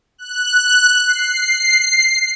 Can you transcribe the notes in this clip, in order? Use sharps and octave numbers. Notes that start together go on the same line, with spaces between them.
F#6
C7